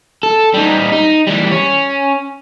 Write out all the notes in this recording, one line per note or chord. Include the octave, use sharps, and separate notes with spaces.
A4
G3 D#4
D#4
E3 G3
C#4